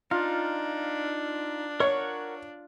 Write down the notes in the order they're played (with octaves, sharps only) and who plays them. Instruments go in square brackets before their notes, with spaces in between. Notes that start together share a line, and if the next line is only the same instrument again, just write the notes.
[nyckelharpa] D4 [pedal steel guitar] D#4 F5 [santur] F4
[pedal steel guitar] A#4 F#5 C#6 [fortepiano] C#5